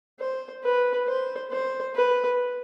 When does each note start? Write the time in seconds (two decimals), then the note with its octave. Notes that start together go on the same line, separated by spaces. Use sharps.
0.20 C5
0.64 B4
1.07 C5
1.52 C5
1.95 B4